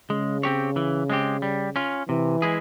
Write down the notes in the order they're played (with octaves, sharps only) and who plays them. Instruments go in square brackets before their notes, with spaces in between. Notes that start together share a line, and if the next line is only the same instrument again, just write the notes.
[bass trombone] C#3 [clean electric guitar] G#3
[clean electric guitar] C4 G4 C#5
E3
G#3 C4 G4
G3
C#4 F4
[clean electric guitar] C3 [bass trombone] E3
[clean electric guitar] G#3 E4 G#4